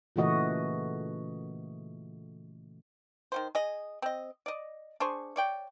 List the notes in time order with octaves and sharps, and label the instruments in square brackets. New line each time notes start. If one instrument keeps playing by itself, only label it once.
[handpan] A#2 C#3 E3 A3 F#4 D#5
[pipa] D#3 F#3 C5
G#4 D#5
C4 D#5
D5 D#5
D4 G#4 C5 C#6
C#5 D5 G5